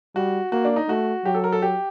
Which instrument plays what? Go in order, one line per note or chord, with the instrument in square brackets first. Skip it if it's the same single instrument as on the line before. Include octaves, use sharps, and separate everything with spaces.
[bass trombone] G3 [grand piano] F#4
[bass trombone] A#3 [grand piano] F#4
[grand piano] D4
D#4
[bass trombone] A3 [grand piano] F#4
[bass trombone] F#3 [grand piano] G4
[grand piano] A4
A#4
A4
G4